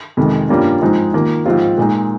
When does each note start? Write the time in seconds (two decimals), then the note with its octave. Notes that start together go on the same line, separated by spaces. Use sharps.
0.17 F2 C3 D#3 G#3
0.49 G2 G3 A#3 C#4 F4
0.81 G#2 F3 G#3 C4 D#4
1.14 D#3 A#3 F4
1.46 G#2 F3 C4 F4
1.78 A#2 G#3 D#4